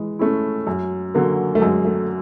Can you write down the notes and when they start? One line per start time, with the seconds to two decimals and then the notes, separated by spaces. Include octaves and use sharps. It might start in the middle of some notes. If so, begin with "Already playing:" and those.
Already playing: E3 G#3
0.19 A3 C#4 E4
0.67 F#2
1.14 D3 F#3 A#3
1.55 A3
1.61 F#2 G#3
1.85 A3